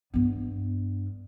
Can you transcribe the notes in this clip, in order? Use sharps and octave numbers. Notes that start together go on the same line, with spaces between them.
G2 B3